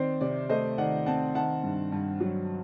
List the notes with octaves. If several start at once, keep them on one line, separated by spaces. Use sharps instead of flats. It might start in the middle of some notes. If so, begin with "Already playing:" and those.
Already playing: D#3 C4 C5 D5
C3 D5
A3 C5 D#5
D#3 D5 F#5
C4 F#5 A5
D#3 F#5 A5
G2
G2
F#3